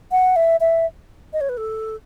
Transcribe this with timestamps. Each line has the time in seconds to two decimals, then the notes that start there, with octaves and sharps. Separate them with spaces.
0.11 F#5
0.36 E5
0.60 E5
1.33 D#5
1.41 C#5
1.49 B4
1.57 A4